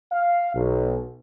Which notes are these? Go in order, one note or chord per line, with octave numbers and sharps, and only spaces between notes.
F5
B1